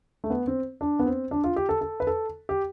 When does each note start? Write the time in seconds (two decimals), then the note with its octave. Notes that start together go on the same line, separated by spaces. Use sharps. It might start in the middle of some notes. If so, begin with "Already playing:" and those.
0.24 A3
0.30 B3
0.47 C4
0.81 D4
0.99 B3
1.06 C4
1.31 D4
1.44 F4
1.56 G4
1.69 A4
1.81 A4
2.00 B4
2.07 A4
2.49 G4